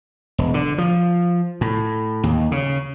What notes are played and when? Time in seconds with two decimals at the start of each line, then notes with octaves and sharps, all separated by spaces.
0.38 E1
0.54 D3
0.78 F3
1.61 A2
2.23 D#2
2.52 C#3